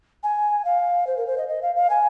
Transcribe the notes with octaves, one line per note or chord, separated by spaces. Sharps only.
G#5
F5
C5
A#4
C5
D#5
D#5
F5
F5
G#5